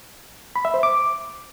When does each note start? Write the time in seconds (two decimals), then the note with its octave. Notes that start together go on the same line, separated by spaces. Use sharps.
0.56 B5
0.65 E5
0.74 C5
0.83 D6